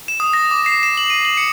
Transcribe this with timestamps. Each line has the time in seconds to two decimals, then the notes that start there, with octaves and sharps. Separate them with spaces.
0.08 E7
0.20 D#6
0.33 A#6
0.51 D6
0.66 C7
0.83 E7
0.97 F#7
1.10 D#7
1.25 F#7
1.37 C#7